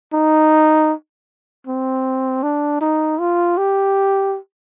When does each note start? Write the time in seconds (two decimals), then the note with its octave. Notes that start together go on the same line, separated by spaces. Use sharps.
0.13 D#4
1.67 C4
2.43 D4
2.81 D#4
3.20 F4
3.57 G4